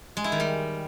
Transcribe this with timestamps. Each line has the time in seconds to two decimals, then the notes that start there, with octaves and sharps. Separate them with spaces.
0.17 G#3
0.24 E4
0.32 D#3
0.40 G3